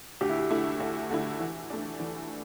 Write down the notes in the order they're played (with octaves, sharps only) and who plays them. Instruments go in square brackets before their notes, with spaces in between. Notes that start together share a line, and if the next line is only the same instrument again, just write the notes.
[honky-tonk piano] D2 [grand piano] G4
[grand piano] E4
G4
[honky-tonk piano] D3 A3 E4
D2
D3 A3 E4
E3
A3 D4
E3